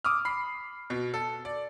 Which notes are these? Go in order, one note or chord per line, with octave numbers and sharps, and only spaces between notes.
D6 D#6 F6
B5 C7
B2
A4
D5